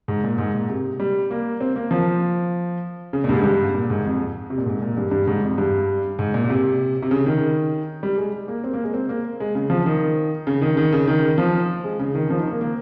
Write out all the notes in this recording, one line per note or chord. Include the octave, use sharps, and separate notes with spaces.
G#2
A#2
G#2
A#2
C3
G3
A#3
C4
A#3
F3
C#3
A#2
G2
G#2
G2
A#2
G#2
F2
C3
A#2
G#2
A#2
G2
G2
G#2
F2
G2
G#2
A#2
A#2
C3
C3
C#3
D#3
G3
G#3
A#3
C4
A#3
G#3
C4
A#3
G#3
C#3
F3
D#3
C#3
D#3
D#3
C#3
D#3
F3
G#3
C#3
D#3
F3
D#3
A#3
A#3